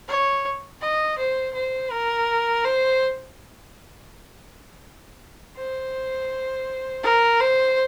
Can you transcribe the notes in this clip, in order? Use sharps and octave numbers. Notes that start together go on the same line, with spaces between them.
C#5
D#5
C5
C5
A#4
C5
C5
A#4
C5